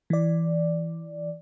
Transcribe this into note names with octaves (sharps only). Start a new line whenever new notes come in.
E3 D5